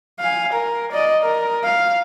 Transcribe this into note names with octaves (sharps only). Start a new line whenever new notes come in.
F5 G#5
A#4
D5 D#5
A#4
F5